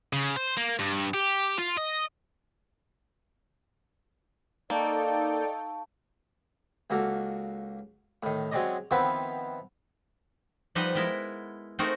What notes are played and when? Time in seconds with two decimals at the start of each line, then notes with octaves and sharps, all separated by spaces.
0.13 C#3
0.36 C5
0.57 A#3
0.79 G2
1.14 G4
1.58 F4
1.77 D#5
4.70 A#3 D#4 A4 D5 F5 G5 A5 C#6
6.90 C#2 A#3 F#4 A4
8.23 A2 D#3
8.51 F#3 G#3 C4 C#4 D5 D#5
8.91 D#3 F3 B3 C4 E4 B4
10.75 F3 G3 D#4 B4 F#5
10.95 G#3 B3 E4 A#4
11.79 A3 C4 D#4 F#4 G#4 A#4